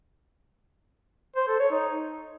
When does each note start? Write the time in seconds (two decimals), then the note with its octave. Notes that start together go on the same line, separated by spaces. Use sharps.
1.36 C5
1.48 A4
1.59 C#5
1.71 D#4